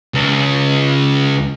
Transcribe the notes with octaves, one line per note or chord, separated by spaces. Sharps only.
C#2